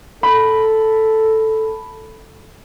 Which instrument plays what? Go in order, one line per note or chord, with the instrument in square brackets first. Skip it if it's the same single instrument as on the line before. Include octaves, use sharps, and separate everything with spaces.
[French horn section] A4 [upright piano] B5